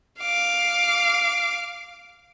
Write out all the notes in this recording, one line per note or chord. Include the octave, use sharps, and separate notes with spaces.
F5 D6